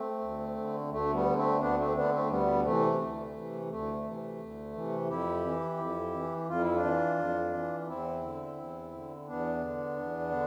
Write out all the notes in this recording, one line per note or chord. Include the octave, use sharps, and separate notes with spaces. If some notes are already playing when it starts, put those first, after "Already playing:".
Already playing: A3 C4
D2
D3
D2 A3
G3 B3
D3
A3 C4
D2 B3 D4
A3 C4
D3 B3 D4
A3 C4
D2 G3 B3
C3 E3 A3
D2
C3 E3
D2 A3
C3 E3
D2
C3 E3
F2 E4 G4
E3
F2
E3
F2 F4
E4
D4 F4
E3
F2
E3
E2 C4 E4
D3
E2
D3
E2 B3 D4
D3
E2
D3